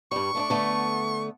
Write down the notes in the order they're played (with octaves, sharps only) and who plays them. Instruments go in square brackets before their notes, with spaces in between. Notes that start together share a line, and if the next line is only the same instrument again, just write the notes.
[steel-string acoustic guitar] G2 G3 [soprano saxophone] C#6
[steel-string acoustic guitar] A3 B3 D4
D3 A3 B3